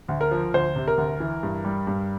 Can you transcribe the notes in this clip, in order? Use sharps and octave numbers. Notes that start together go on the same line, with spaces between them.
D2
A#4
F3
D2 C5
C3
A#4
D2
E3
G2
G3
G2